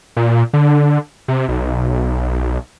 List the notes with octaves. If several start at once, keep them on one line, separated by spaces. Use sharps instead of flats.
A#2
D3
C3
B1